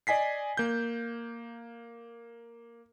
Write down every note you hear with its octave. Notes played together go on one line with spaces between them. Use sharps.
D5 D#5 G#5 B6 C7
A#3 G6